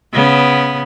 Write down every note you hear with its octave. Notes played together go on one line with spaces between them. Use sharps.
C#3 B3